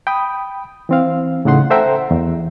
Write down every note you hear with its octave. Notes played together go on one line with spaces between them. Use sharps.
G5 B5 D#6
E3 C4 F5
A2 C#3 D#4 F#5 C6
A4 C5 E5 F#5 G5 A#5
E2